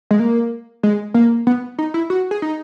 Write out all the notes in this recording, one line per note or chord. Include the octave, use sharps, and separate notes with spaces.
G#3
A#3
G#3
A#3
B3
D#4
E4
F#4
G#4
D#4